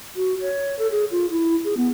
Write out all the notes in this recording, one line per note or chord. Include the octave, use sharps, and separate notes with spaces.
F#4
C#5
A4
G#4
F4
E4
G#4
B3